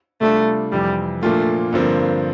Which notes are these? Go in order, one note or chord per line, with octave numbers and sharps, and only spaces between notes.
C3 G3 A3 D4 F4
F2 C3 E3 G3
A#2 F3 A3 A#3 D4 F4
G2 D3 F3 A#3 C4